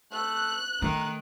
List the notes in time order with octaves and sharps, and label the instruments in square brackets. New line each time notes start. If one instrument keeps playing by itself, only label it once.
[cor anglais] A3 [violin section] F#6
[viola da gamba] D#3 [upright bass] A3 [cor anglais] A#4